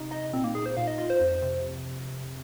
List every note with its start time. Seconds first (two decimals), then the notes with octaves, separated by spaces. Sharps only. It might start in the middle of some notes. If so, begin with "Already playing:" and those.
Already playing: C3 D#4
0.11 D#4 D#5
0.33 A#2 C4
0.44 A#3
0.55 A#2 G#4
0.66 C5
0.77 A#2 F5
0.87 D#5
0.98 F4 D#5
1.10 C5
1.21 F2
1.42 C3